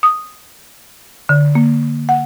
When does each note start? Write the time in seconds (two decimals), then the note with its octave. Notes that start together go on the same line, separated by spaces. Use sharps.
0.03 D#6
1.29 D3
1.55 A#3
2.09 F#5